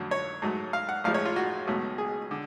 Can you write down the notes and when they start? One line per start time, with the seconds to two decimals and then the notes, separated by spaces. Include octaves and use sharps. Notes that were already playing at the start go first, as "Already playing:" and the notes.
Already playing: F2 D3 F#3 A3
0.11 C#5
0.42 G#2 F#3 A3
0.73 F5
0.89 F#5
1.04 A1 A2 F3 G#3 F5
1.14 C#5
1.25 F4
1.36 F#4
1.67 C#2 B2 F#3 A3
1.98 G#4
2.31 D3